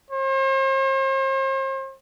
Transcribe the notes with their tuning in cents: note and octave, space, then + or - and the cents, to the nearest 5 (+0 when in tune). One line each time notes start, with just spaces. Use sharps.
C5 +40